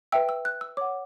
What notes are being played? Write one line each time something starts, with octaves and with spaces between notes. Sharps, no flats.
B4 E5 G5 E6
E6
F#6
E6
C#5 F#5 D6